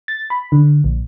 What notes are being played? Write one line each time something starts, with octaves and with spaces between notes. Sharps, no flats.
A6
B5
D3
A#1